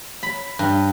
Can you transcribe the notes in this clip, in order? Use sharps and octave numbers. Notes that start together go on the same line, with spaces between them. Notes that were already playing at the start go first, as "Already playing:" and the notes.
B5
G2